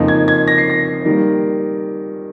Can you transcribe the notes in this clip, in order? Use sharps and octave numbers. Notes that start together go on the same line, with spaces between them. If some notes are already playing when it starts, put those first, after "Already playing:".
Already playing: F2 C#3 F3 A#3 D#4
G#6
G#6
A#6
C7
A#6
D#3 G3 A#3